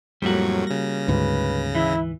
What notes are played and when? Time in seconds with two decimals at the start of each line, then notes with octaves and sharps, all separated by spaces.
0.22 F2 A2 F#3 G3 A#3 F#4
0.67 C#3 A#6
1.08 D2 G#2 B4
1.75 E3 E4